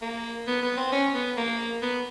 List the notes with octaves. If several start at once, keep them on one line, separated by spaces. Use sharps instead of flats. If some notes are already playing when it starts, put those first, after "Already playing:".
A#3
B3
B3
C4
C#4
B3
A#3
B3